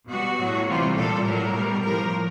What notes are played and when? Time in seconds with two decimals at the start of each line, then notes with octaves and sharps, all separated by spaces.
0.10 B2 G3 F#4
0.38 A2 F#3
0.67 C3 E3 G3 F4
0.96 A#2 G3 A4
1.25 A2 F#3 A#4
1.54 B2 G3
1.82 A2 F3 A#4